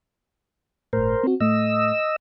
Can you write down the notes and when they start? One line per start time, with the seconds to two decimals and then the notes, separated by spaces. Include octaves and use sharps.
0.93 G1 A2 A#4 C5
1.23 C4 F#4
1.40 A2 A3 D#5 E6